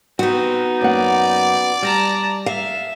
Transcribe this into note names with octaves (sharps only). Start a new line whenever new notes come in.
B3 C4 D#4 F#4
F#2 A#3 D5 F#5
G3 A5 A#5
E5 F5